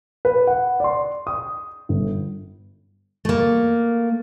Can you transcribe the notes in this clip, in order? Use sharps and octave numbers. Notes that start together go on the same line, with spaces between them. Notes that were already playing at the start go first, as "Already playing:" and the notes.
B4
F#5
D5 C6
D#6
G1
A3 A#3